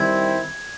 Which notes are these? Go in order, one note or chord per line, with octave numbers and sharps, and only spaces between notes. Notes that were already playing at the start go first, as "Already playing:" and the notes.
Already playing: D#3 G3 C4 E4 G#6